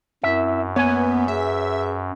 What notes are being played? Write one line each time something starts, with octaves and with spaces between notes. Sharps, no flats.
F#2 C4 E4 A#4 E5
A#3 B3 C#5 G#5
G#4 B4 E5